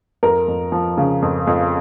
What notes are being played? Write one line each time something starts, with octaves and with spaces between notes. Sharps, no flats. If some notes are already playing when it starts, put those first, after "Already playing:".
F2 A#4
F2
F3
C#3
F2
F2